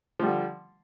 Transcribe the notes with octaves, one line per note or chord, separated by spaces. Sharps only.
D3 F3 G3